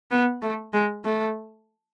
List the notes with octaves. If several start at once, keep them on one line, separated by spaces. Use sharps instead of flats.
B3
A3
G#3
A3